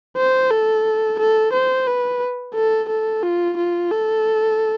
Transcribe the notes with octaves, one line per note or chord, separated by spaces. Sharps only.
C5
A4
A4
C5
B4
A4
A4
F4
F4
A4